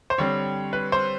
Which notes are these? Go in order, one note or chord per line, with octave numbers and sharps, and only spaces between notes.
C5
D3 G3 C4 C#5
B4
C5